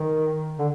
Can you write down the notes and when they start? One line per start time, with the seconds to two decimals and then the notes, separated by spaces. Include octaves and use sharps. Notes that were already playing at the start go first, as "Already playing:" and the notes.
Already playing: D#3
0.58 D3